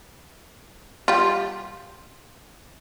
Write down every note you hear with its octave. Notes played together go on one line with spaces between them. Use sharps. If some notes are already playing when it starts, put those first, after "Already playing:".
G3 F4